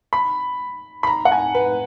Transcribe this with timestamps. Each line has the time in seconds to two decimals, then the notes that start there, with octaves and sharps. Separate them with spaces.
0.13 B5
1.03 B5
1.07 A#5
1.25 F#5
1.32 G#5
1.55 B4